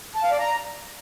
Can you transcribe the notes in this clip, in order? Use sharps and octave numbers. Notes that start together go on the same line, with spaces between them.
A5
F5
D5
A#5